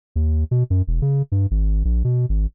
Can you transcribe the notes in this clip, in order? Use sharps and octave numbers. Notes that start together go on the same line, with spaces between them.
D#2
B2
F#2
E1
C#3
G2
G#1
A#1
B2
G#1